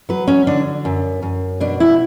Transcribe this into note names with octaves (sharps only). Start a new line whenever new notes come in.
F#3 B4
C#4
D3 D4
F#2
F#2
B2 D4
E4